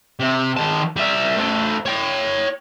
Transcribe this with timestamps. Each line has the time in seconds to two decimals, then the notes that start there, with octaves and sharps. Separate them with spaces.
0.20 C3
0.57 D#3 A5
0.96 G3 E5
1.37 A3 C5
1.86 C#5 G5